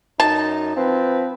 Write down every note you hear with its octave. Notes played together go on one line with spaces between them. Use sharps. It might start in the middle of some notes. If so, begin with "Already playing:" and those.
F#2 D#4 A5
F3 C4 B4